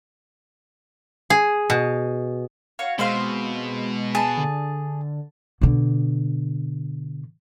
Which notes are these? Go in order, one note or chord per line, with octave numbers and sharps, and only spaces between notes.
G#4
B2
F#4 C#5 F5
B2 G#3 C4 C5 F5
G#4 A5
D3
B2 D3